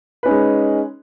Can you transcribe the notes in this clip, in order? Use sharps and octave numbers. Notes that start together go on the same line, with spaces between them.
G#3 C#4 D#4 B4